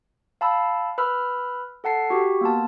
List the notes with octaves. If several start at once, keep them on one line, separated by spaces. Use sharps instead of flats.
F5 A5 B5 E6
B4 B5 E6 F6
A4 F#5 A5 C7
F#4 G4
A#3 B3 A5